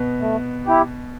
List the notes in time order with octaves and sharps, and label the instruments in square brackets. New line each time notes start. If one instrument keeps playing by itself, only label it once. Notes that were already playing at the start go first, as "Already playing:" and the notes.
Already playing: [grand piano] B2 B3
[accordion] A3
E4 G4